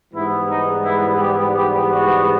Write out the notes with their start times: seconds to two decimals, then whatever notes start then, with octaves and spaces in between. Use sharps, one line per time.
0.14 G#2 E3 G3 B3 E4
0.49 D#4
0.84 E4
1.19 G4
1.55 G4
1.90 F#4